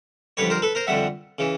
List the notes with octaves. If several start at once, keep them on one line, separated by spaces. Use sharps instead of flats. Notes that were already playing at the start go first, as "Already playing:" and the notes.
F2 D3 G3 B4 C#5
A#4 C5
A4 B4
A#4 C5
F2 D3 G3 E5 F#5
C#3 E3